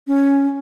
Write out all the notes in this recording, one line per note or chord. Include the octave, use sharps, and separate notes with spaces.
C#4